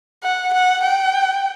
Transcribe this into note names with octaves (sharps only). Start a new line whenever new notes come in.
F#5
F#5
G5